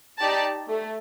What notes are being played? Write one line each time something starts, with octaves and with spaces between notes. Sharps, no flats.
D#4 G4 D5 A5
A3